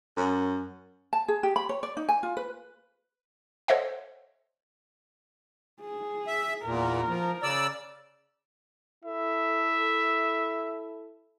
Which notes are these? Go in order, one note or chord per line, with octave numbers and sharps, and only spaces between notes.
F#2
A5
G#4
G4
B5
C#5
D5
D#4
G#5
F4
B4
A4 C5 C#5 D#5 E5 F#5
G#4
E5
E2 A#2 A#4
F3
C#3 D5 E6
E4 A4 E5